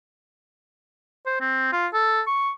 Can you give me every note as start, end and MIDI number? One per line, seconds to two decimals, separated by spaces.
1.26 1.38 72
1.41 1.68 60
1.73 1.87 65
1.93 2.21 69
2.27 2.50 85